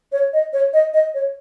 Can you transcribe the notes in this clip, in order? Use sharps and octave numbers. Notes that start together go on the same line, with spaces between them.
C#5
D#5
C#5
D#5
D#5
C#5